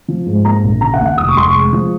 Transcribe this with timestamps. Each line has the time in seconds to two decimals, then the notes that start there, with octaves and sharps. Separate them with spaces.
0.08 F3
0.26 G#2
0.45 A#3 A#5
0.64 A#1
0.81 C#3 A#5
0.94 F#5
1.00 D#2
1.06 F#5
1.18 F1 D#6
1.29 C#6
1.36 F1 C6
1.48 C#6
1.54 G#3
1.73 F3